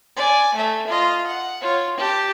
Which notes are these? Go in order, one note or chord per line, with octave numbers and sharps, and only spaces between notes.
D5 G#5
A3 E5
F4 D#5
F#5
F4 C#5
G4 A5